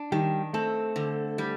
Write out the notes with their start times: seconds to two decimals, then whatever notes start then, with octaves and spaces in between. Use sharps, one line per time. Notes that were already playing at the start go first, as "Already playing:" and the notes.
Already playing: D4
0.12 D#3 G3 G4
0.53 A3 C4 A4
0.96 D3
1.38 G3